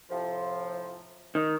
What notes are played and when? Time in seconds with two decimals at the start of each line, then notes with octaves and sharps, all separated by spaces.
0.11 A2 C3 F3
1.35 D#3